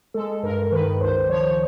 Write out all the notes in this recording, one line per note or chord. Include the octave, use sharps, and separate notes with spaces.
G#3 A4
G2 A#4
D#3 B4
C#2 C5
F3 C#5